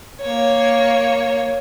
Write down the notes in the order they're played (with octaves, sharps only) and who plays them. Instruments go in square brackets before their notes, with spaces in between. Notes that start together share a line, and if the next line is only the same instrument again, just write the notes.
[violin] A#3 C#5